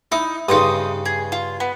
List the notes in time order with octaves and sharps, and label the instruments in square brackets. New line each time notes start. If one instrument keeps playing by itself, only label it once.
[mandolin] D#4 [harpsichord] E4
[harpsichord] G2 C#3 [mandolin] D#4 C6 D#6
[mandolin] G#4
F4
B3